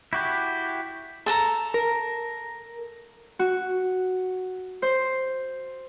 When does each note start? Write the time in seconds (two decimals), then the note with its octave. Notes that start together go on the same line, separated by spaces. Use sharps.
0.13 E4 F#4 G4
1.26 A4 A5 A#5
1.74 A#4
3.39 F#4
4.82 C5